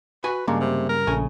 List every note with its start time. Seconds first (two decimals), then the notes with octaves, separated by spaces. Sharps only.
0.24 F#4 B4 G#5
0.47 G2 C#3 G#3 A#3 D4
0.60 C3
0.89 A#4
1.07 A#1 C#3 A3 G#5